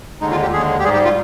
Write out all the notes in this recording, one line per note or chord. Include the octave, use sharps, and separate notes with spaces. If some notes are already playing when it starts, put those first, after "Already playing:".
D#2 D3 G#3 D#4
F4
G4
D#2 D3 G#3 G#4
G4
G#2 G3 G#4
G4
F4